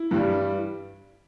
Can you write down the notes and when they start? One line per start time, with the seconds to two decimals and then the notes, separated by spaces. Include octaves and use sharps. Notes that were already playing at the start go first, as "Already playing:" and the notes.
Already playing: E4
0.11 G2 E3 G3